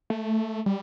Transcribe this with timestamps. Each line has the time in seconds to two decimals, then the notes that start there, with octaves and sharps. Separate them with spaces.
0.10 A3
0.66 G3